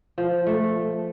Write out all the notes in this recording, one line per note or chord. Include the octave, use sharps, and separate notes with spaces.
F3
A3